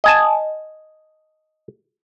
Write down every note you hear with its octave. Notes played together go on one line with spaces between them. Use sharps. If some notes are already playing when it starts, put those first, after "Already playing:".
D#5 G#5 A5